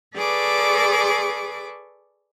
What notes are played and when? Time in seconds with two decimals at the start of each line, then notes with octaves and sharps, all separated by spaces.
0.14 G#4 A4 B4 D5 C#6 D6